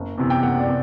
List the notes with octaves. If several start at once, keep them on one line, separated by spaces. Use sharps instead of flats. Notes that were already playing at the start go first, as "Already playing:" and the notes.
Already playing: F#1
E2 C3 E3
G5
F#1 F#5
D5
C3